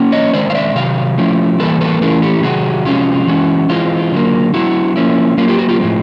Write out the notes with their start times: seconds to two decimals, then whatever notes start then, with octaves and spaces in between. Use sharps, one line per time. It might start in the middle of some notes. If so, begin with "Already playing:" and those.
Already playing: F#3 A#3 C#4
0.12 C#5 D#5
0.33 D#3 G#3 C4 C5 D5
0.50 F5
0.54 D5 E5
0.75 C3 D#3 F#3 F5
1.18 F3 A3 C#4 E4
1.59 E3 G3 A#3 A4 B4
1.81 A4 B4
2.01 E3 A3 C#4 E4 G#4 A#4
2.22 G4 A4
2.43 C3 D#3 F#3 F#4 G#4
2.85 C3 F3 G#3 C#4 F4
3.27 E3 G#3 C#4 F#4
3.69 E3 G#3 C4 F4
4.12 D3 F#3 A#3
4.54 F#3 B3 E4 F#4
4.96 F3 A#3 C#4 E4
5.38 F#3 A#3 C#4 F4
5.48 F4 G4
5.59 F#4
5.69 F4 G4
5.80 A2 F3 G#3 C4